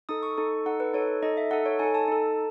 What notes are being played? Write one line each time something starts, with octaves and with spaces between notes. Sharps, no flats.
D#4 A4 D#6
C#6
D#4 A4
D#4 A4 F#5
B4
D#4 A4 C#5
D#4 A4 D#5
E5
D#4 A4 F#5
C#5
D#4 A4 G#5
A5
D#4 A4